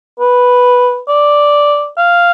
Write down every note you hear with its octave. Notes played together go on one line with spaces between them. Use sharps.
B4
D5
F5